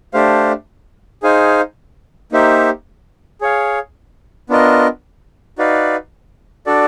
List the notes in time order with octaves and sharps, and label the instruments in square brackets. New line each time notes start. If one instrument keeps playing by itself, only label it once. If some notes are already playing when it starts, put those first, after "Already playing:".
[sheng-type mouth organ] A3 D4 G4 C5 F5
D#4 G#4 C5 F5 G#5
A#3 D#4 G4 C5 E5
G#4 C#5 F5
B3 D4 F4 A#4 D#5
D#4 F#4 B4 D5 F5
D4 F#4 A4 D5